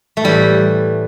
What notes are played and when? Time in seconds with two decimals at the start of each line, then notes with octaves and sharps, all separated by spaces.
0.17 A3
0.24 A2 E3 G3